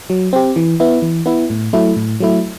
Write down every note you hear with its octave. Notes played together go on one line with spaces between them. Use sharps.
F#3
C4 G4
E3
B3 E4
E3
B3 E4
A2
F#3 A3 E4
A2
F#3 A3 E4